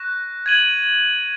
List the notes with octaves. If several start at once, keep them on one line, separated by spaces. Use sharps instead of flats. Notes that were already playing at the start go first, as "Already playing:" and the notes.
Already playing: C#6 F#6 A#6 E7
G#6 D#7 F#7